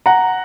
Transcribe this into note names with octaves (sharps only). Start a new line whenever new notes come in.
F#5 A#5